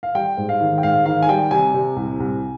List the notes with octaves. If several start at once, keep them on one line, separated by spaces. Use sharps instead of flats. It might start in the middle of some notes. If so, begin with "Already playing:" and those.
F5
G3 G5
G#2
F5
D#3
G5
G#2 F5
D#3 F5
G#5
G3 G5
C3 G#5
C3
C2
C2